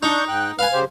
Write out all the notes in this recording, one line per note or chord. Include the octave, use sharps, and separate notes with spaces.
D4 D#4 C#6 G6
G#2 G5 F#6
B4 F5 G#5
C#3 G4 C5